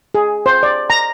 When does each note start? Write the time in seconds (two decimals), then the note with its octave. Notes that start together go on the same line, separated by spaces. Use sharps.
0.15 G#4
0.46 C5
0.63 D5
0.90 A#5